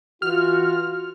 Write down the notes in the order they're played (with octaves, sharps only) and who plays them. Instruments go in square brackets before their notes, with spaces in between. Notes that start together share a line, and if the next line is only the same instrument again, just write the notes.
[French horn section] E3 F#4 [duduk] F4 [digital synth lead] F6